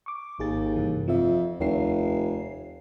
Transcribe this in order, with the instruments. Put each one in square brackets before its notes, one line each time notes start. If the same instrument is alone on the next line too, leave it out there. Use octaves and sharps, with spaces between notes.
[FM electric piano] C#6 D6
[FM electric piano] G#1 G#4 A6 [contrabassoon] D#2
[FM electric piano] G2 C3 E3
[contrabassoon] F2 [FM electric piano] F3 E5
[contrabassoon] F1 [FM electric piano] D#2 C#5 C7